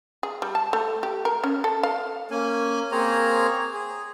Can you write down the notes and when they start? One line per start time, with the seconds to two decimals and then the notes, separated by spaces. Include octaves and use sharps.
0.23 G#4
0.42 G3
0.55 A5
0.73 A3
1.03 G4
1.25 A#4
1.44 C#4
1.64 A4
1.83 F5
2.31 A#3 C#4 G#5
2.92 A#3 C4 G#4 C5 C#5 A#5
3.74 G#4